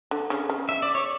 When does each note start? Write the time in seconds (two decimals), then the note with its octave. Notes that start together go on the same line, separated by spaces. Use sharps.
0.11 D3
0.30 C#3
0.50 C#3
0.69 E5
0.82 D5
0.95 C#5